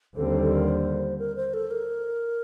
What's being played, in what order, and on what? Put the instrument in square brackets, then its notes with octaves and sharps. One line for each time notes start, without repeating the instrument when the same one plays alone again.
[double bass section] D#2 D3 G3 C4 [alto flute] A4
[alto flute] A4
A4
A#4
C5
A#4
C5
A4
A#4